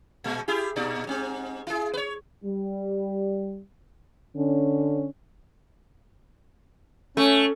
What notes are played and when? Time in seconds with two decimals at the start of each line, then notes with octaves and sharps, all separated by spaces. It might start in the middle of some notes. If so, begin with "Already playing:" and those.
0.24 A#2 G#3
0.48 E4 G4 G#4
0.76 A#2 D#4 D5
1.07 G#2 C4
1.67 E4 G#4
1.93 B4 C#5
2.45 G3
4.35 D3 C#4
7.17 A3 C#4